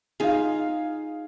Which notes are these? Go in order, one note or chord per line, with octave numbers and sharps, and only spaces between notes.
D#4 F4 G#4 F5